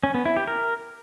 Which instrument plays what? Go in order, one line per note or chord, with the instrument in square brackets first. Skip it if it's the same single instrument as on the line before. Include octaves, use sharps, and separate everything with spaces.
[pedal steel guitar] C#4
B3
E4
G4
A#4